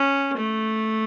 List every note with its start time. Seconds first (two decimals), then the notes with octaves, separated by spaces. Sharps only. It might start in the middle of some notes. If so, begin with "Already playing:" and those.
Already playing: C#4
0.38 A3